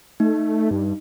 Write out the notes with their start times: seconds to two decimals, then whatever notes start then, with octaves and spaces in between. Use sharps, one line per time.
0.20 A3 D#4
0.71 G2